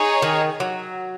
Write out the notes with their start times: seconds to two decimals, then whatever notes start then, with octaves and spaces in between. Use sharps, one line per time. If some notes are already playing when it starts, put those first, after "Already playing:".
Already playing: D#4 G#4 C#5
0.22 D#3
0.60 F#3